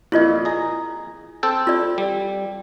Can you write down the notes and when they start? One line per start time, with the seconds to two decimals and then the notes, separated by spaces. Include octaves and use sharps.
0.12 F2 A#2 E4 F4 D#5
0.45 G#4 A#5
1.43 C4 A4 G5
1.67 F4 D5
1.98 G3